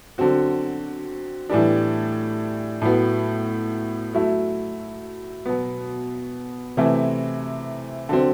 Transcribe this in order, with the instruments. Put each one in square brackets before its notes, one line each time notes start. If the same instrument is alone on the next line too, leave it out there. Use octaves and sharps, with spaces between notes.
[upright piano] D3 F#3 C4 F#4
A2 E3 G3 D4
A2 F#3 B3
F#3 A3 E4
B2 F#3 B3
C3 E3 A3 C4 E4
D3 F#3 C4